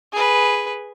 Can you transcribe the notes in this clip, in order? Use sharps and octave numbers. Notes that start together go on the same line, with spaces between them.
G#4 B4